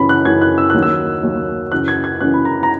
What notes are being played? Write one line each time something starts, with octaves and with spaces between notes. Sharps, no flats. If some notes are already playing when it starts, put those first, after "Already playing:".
Already playing: F#2 C#3 E3 B5
F#6
F#2 C#3 E3 G#6
F#6
E6
D#2 D#3 F#3 F#6
E6
D#2 D#3 F#3
F#2 C#3 E3 F#6
G#6
G#6
F#2 C#3 E3 F#6
B5
A#5
A#5